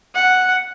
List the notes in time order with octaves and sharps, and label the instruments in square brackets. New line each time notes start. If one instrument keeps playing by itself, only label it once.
[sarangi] F#5